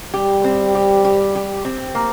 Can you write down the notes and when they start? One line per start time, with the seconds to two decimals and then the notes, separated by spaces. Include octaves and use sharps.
0.14 G3 G4
0.44 C4
0.75 G4
1.05 G4
1.35 G4
1.65 C4
1.95 A#3